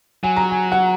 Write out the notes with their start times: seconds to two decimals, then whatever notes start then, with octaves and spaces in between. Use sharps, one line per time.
0.23 F#3 G#5
0.37 A#5
0.51 G#5
0.72 F#5